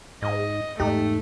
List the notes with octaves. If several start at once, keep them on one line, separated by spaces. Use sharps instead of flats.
G#2 D#5
E2 G#2 G#3 A3 D#4 G4